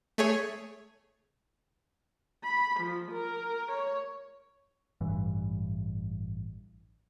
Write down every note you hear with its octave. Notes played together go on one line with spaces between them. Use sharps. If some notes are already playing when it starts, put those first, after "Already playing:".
A3 G#4 C#5
B5
F3
A#4
C#5
A1 G2 E3